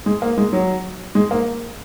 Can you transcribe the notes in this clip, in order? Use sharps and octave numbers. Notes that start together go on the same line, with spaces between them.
G#3
A#3
G#3
F#3
G#3
A#3